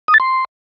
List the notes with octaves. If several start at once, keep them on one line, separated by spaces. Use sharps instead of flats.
D#6
A6
C6